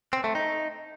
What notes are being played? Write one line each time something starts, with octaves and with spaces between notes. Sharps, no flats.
C4
A3
D#4